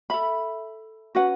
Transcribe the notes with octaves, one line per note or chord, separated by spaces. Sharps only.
A4 E5 B5
C#4 F#4 B4 F#5